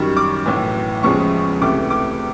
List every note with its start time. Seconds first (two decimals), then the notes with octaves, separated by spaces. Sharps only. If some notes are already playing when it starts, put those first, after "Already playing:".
Already playing: F#2 D#3 G3 C#6
0.17 D6
0.46 B1 A2 E3
1.03 E2 C#3 F3 G#3 C#6
1.61 C#2 C3 E3 A3 D6
1.90 D6